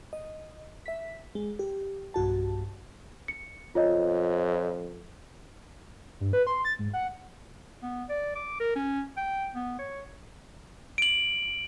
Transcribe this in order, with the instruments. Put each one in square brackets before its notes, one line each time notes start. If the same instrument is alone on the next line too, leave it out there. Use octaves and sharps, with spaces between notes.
[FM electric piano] D#5
E5 B6
G#3
G4
B1 G2 F#4 A5
[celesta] C#7
[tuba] F2 [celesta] F4 C#5 D#5
[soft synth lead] G2
B4
C6
A6
G#2
F#5
[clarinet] B3
D5
D6
A#4
C#4
G5
B3
C#5
[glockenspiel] D7 F#7